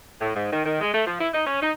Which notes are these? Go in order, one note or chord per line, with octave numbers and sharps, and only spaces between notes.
A2
G#2
D#3
D#3
G#3
A3
F3
E4
D#4
C#4
D#4